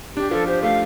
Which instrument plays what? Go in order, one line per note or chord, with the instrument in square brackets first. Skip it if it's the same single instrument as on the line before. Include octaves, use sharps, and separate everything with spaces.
[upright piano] D4 [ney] G4
[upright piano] F3 [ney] A4
[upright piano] G4 [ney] C5
[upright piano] A3 [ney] F5